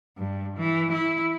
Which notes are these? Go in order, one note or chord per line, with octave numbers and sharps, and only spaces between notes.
G2
E3
E4